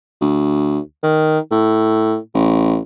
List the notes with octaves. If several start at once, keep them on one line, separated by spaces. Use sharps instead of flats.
D2
D#3
A2
A1